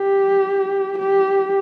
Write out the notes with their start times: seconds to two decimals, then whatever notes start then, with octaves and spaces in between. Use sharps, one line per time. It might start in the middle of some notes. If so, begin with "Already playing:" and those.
Already playing: G4
0.98 G4